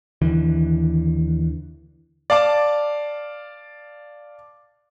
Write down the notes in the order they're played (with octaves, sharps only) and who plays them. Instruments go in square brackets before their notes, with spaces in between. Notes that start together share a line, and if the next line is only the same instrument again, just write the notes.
[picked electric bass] D#2 D3 E3
[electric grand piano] D5 F5 A5 D6